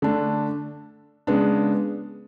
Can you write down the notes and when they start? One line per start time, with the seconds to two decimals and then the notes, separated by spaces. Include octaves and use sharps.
0.02 D3 A3 D4
1.27 C#3 G#3 B3 D4